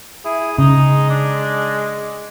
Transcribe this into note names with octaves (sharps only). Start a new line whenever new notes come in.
E4 G#4
C#3 G#3 D#4
D4